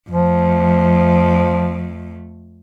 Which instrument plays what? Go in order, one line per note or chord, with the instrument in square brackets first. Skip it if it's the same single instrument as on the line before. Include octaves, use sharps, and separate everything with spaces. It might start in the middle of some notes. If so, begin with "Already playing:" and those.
[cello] F2 A3 [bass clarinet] F3